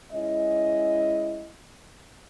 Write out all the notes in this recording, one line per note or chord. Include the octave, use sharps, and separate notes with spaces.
G#3 C#4 E4 D#5